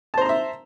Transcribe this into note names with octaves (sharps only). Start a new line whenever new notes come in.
C5 E5 A5 A#5 C6